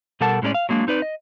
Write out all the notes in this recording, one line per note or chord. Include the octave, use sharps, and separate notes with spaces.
B2 G3 A4 A#4 F#5 A5
A2 G#3 C#4 A4 D5
F5
F#3 G#3 A#3 D4
C4 D#4 B4 D5
D#5